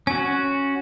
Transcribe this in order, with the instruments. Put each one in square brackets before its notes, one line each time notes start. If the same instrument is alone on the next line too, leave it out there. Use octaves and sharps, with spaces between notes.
[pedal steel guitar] C#4 F#4 [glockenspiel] G#5